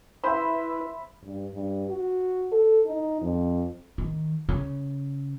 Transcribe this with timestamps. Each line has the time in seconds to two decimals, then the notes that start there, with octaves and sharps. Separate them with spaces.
0.24 E4 B4 C5 E5 B5
1.23 G2
1.53 G2
1.89 F#4
2.52 A4
2.86 D#4
3.21 F2
3.98 D#3
4.49 C#3